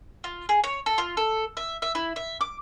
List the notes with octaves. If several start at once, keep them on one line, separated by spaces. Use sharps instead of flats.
F4
G#4
C#5
A4
F4
A4
E5
E5
E4
E5
D6